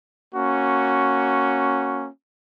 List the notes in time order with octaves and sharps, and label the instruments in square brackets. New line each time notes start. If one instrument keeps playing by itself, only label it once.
[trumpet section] A#3 C#4 F#4